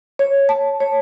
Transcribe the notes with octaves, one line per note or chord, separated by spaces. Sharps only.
C#5
A5
C#5